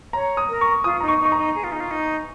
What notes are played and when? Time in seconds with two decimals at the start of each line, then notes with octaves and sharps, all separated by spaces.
0.13 C#5 A#5
0.37 D#6
0.49 A#4
0.61 C#6
0.84 F4 D#6
1.00 D#4 A#5
1.08 C#6
1.21 D#4 C#6
1.32 A#5
1.38 D#4
1.55 G#4
1.64 F4
1.72 D#4
1.80 F4
1.91 D#4